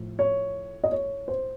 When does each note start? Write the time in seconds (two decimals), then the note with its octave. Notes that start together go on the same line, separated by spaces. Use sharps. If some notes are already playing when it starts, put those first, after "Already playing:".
Already playing: A2 F3
0.19 C#5
0.83 D#5
0.92 C#5
1.28 C5